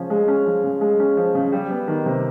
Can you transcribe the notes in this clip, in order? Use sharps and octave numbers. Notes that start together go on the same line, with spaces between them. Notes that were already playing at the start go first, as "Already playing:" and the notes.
Already playing: C#3 F3 G#3 C#4
G#3
C#4
F3
C#3
G#3
C#4
F3
C#3
G3
B3
D#3
C3